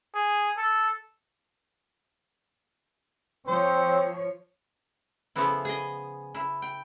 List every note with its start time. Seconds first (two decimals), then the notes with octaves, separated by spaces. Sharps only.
0.15 G#4
0.58 A4
3.47 F3 C4 C5 C#5
5.36 C#3 F3 A3 B3 E4
5.65 G#4 D#5
6.35 E4
6.62 G5